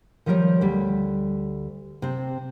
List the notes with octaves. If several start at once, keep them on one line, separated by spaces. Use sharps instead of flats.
D#3 F3 G3 A#4 C#5
D2 G3
C3 C4